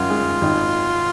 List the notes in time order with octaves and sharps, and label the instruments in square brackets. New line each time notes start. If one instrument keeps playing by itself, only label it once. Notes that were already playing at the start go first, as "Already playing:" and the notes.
Already playing: [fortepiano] F#2 [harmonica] F4
[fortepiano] G#3
G#1